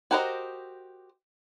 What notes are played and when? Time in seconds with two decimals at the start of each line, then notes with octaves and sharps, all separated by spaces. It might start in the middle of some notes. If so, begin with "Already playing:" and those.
0.11 F#4 G4 A#4 C5 D#5